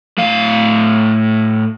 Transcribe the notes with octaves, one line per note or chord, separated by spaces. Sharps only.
A2 F5